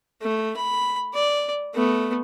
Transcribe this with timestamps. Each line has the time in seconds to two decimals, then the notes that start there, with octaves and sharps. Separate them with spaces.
0.22 A3
0.57 B5
1.14 D5
1.75 A3 B3